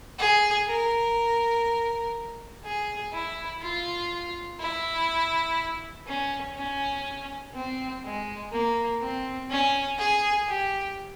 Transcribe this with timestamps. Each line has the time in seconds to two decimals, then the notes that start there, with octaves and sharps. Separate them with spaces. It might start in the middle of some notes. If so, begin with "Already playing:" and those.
0.19 G#4
0.68 A#4
2.64 G#4
3.12 E4
3.62 F4
4.60 E4
6.07 C#4
6.57 C#4
7.54 C4
8.03 G#3
8.52 A#3
9.01 C4
9.50 C#4
9.98 G#4
10.48 G4